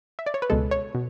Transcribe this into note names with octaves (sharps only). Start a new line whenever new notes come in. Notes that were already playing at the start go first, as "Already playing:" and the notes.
E5
D5
C#5
B4
C#2 B2 G#3 A4
C#5
B2